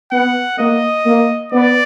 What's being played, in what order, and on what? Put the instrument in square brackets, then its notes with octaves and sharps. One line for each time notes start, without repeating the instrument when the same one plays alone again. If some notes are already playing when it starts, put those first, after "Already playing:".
[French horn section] B3 [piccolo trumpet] F#5
[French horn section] A#3 [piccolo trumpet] D#5
[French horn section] A#3
[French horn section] B3 [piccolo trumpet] D5